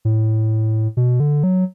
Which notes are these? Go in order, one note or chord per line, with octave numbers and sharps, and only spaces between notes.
A2
B2
D3
F#3